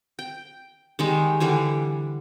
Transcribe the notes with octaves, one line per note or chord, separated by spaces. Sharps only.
G5
D#3 G3 G#3
D3 E3 G3 G#5